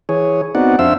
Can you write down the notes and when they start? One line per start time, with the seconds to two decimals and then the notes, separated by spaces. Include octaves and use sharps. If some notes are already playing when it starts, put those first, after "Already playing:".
0.09 E3 G#4 C#5
0.55 B3 C4 D#4 F#4 D5 F#5
0.79 F2 D4 C5 E5 F5 E6